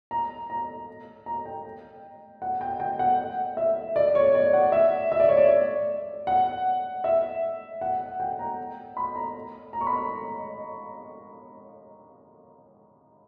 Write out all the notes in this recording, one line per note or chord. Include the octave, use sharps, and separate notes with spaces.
A#5
A#5
A#5
G5
F#5
G5
G5
F#5
E5
D5
C#5
D5
F#5
E5
E5
D5
C#5
D5
F#5
E5
F#5
G5
A#5
B5
A#5
A#5
C#6
B5